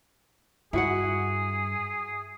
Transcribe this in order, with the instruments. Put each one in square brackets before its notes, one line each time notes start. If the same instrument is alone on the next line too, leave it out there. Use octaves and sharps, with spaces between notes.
[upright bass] G2 [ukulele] E4 F#4 F#5 [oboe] G#4